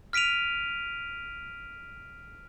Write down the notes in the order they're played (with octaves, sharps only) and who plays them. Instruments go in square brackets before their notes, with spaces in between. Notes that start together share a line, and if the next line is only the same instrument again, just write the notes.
[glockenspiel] F6 B6 D7 D#7 F7